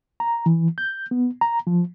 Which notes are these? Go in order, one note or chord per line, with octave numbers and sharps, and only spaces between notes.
A#5
E3
G6
B3
A#5
F3